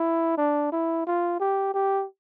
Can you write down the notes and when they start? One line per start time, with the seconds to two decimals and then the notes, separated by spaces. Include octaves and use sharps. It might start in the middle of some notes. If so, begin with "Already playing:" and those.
Already playing: E4
0.38 D4
0.72 E4
1.07 F4
1.40 G4
1.74 G4